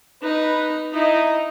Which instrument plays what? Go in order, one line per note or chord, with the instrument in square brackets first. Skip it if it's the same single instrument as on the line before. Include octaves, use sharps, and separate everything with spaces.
[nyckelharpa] D#4 [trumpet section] B4
[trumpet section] D#4 [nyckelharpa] E4